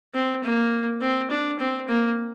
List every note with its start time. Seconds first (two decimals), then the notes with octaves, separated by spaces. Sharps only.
0.15 C4
0.44 A#3
1.01 C4
1.31 D4
1.60 C4
1.89 A#3